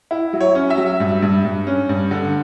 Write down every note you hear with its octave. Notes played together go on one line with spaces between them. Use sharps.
E4
F#3
C#5
C#4
E5
F#3
G2
G2
G2
C#4
G2
D3